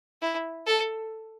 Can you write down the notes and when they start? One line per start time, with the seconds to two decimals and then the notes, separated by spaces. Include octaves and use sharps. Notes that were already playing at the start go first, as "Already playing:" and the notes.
0.22 E4
0.67 A4